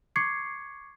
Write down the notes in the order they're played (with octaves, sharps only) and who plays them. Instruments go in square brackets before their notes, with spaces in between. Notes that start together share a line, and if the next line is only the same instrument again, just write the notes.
[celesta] C#6 D6 G#6 C7 C#7